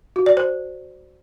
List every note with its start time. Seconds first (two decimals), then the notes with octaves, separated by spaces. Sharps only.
0.16 F#4
0.26 D5
0.37 C5